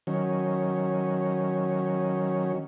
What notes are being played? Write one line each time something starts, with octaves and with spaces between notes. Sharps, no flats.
D#3 F#3 C#4